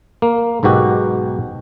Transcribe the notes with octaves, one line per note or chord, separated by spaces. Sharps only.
A#3
B1 G#2 B2 F#4 G4